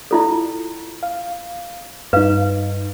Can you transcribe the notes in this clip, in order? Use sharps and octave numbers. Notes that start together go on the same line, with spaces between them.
E4 F4 A4
F5
G2 D#4 B4 F5